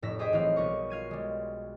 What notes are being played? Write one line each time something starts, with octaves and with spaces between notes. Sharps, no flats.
F1 A2 E5 E6 A#6
G4 G#4 C5 D#5 E5 G5
A1 A2 F#3 C4 F5
B1 G3 A#4 C#6
F4 F5 G#6 D#7
G3 G#3